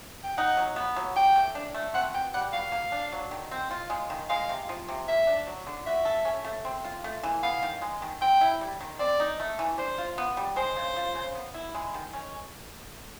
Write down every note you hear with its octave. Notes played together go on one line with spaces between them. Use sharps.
G5
D#4 F#5
F#3
B3
F#3
G4 G5
A3
D4
A3
C4 F#5
B2 G5
G3 F#5
B2 F5
A#3
D4
F#3
D#3
C4
F4
G#3
D#3
G#3 F5
C3
F3
C3
A#3 E5
D4
F#3
D3
F#4 E5
A4
C#4
A3
C4
F4
A3
E3
B3 F5
D#3
G#3
D#3
C4 G5
E4
G3
D#3
C4 D5
D#4
A3
E3
D4 C5
F4
B3
G3
G#3 C5
C#3
F3
C#3
B3
E4
G#3
D#3
C#4